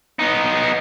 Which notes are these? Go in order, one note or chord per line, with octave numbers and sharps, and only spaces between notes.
B3 D#4